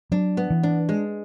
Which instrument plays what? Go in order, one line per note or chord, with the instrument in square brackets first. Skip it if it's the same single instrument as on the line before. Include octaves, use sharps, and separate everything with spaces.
[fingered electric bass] F#3 [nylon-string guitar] D4
[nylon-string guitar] B3
[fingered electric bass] E3
[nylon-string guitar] D4
G#3